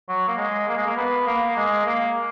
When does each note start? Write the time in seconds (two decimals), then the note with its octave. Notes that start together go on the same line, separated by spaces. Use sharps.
0.09 F#3
0.28 A#3
0.37 G#3
0.68 A#3
0.77 G#3
0.87 A#3
0.97 B3
1.27 A#3
1.56 G#3
1.86 A#3